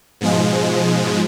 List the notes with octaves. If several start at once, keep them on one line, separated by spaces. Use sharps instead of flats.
G#2 B2 F3 G#3